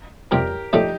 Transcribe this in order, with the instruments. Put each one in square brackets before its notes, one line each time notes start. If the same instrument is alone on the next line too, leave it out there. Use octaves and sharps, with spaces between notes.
[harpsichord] F2 C3 G3 D4 [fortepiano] G4 A#4
[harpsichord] A2 F3 A3 D4 A4 [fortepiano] D#4 G4